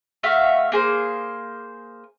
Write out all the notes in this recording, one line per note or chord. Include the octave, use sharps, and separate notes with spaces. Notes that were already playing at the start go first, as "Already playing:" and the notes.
A3 F#4 E5 F5
A#3 G#4 C5